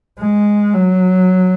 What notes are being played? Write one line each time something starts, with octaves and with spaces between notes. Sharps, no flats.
G#3
F#3